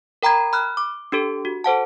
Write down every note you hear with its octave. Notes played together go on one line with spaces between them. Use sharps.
A#4 G5 A#5 B5 G#6
B5 F6 F#6
D6
D4 G4 A4
F#4
A4 C5 F#5 A5